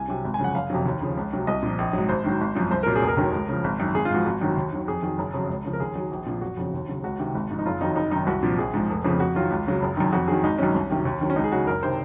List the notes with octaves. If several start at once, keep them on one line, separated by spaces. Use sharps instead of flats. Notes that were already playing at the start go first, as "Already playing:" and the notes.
Already playing: C2 G#5
C3 F#3
G#1
G#5
F#2 C#3 F3 F#5
F#1 F5
F2 C3 F#3
D#2
C#3 F3
C#2
C3 F#3
C2 D#5
A#2 F3
A#1
G#2 F#3
G#1 C5
G#2 D#3 F#3
G#1
F#2 F3
C2 C5
A#2 F#3 A#4
G#4
F1
A#4
D#2 D#3 F#3
C#2
C#3 F3
G#1
F#2 D#3
G#1 G#4
F4
G#2 F3 F#4
G#1 F#4
F#2 D#3 F#3
D#2
D#3 F#3
F2 G#4
D#3 F#3
F#1
F2 C#3 F#3
C#2
C#3 F3
A#4
D#2 G#4
D#3 F#3
A#1
A#2 F3
F#1 F#4
F2 C#3 F#3
D#2
C#3 F#3
C#2 F#4
C3 D#3
G#1
G#2 F3
D#4
F#1 F4
F2 D#3 F#3 D#4
F#1 D#4
F#2 D#3 D#4
C2 F#4
A#2 F3
A#1 G#4
G#2 F3
F1
F2 C#3 F3
F2 F#4
D#3 F#3 F4
C#2
C#3 F#3
F#1
F#2 D#3
F2 F#4
D#3 F#3 G#4
G#1 D#4
F#2 D#3 F#3 C#4
C2
C3 D#3 F#3
D#2
D#3 F#3
C#4
C#2 D#4
G#4
C#3 F#3 F#4
F#1 A#4
C3 D#3 C5